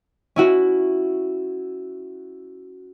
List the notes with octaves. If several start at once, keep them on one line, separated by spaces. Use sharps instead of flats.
C#4 E4 F#4